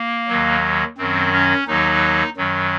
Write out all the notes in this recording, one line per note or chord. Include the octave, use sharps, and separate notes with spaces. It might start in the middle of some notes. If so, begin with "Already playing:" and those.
Already playing: A#3
D#2 D#3 F#3
F#2 D#3 F#3 C4
C#4
D#2 D#3 F#3 D#4
F#2 D#3 F#3